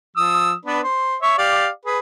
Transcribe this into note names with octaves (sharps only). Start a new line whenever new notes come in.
F3 D#6 E6
B3 D4 B4
C5
C#5 E5 C#6
G4 D5 F5
G#4 B4